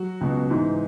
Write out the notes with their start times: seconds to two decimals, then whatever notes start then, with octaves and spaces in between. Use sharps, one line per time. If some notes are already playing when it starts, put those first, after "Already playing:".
Already playing: F#3 F#4
0.21 C#2 B2
0.50 G#2 E3